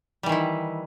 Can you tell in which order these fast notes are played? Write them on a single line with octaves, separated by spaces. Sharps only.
G3 E3 D#3 E4